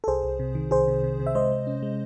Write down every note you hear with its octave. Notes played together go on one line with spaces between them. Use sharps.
A4
C2 G#4 C5
C2
C3
D#3
C2 G#4 C5
C3
C3
C3
E5
G#3 C5 D#5
G#3
C#4
G#3